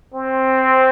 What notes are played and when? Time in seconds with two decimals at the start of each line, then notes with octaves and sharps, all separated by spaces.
0.14 C4